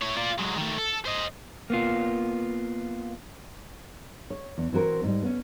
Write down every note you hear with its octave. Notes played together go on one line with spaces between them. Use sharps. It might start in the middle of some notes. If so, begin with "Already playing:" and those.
E4 C#5
F4 D5
F#3 G#3
D#3 A3
A4
C5 D#5
A#3 B3 F4
C#5
E2
E3 C4 F#4 A#4 C5
G#2 G3
B3 C#4